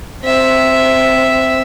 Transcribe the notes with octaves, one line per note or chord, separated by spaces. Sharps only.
C4 E5